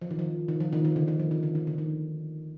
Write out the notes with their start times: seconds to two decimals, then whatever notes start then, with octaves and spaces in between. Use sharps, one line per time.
0.02 F3
0.10 D#3
0.19 F3
0.48 D#3
0.60 F3
0.73 D#3
0.85 D#3
0.96 D3
1.08 D#3
1.20 F3
1.31 D#3
1.43 D3
1.55 D#3
1.67 D3
1.78 D#3